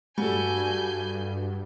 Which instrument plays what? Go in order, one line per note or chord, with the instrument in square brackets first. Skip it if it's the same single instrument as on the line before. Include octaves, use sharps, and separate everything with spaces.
[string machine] G2 [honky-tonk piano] G3 [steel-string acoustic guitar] F#4 A4 [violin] G#5 G6